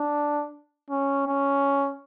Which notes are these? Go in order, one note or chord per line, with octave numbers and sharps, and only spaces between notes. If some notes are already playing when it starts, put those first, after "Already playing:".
Already playing: D4
C#4
C#4